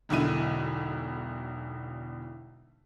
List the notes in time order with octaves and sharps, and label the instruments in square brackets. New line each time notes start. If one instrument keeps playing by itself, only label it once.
[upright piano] E1 B1 D3 E4 D#7